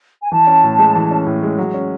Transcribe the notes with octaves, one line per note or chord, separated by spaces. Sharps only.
G#5
E3 A5
C#4
A2
G#3
E3
C#4
A2
G#3
F#3
C#4